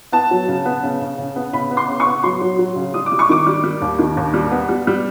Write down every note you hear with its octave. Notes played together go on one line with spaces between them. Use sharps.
B3 A5
F#3
C#3
B3
C#3
C#3
C#3
B3
C#3 B5
B3
C6
C#3
C#6
B3
F#3 C6
F#3
F#3
C#3
G3 D#6
D6
G3
C#6
D#3 D6
G3
G3
D#2
D#3
D#2
G3
B3
G3
G3